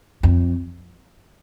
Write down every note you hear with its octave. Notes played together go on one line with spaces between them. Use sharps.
F2